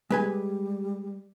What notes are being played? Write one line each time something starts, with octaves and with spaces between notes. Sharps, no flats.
G3 G#3 B4 G#5